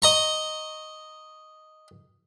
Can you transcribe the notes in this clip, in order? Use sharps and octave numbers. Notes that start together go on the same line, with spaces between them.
D#5 A#5 C#6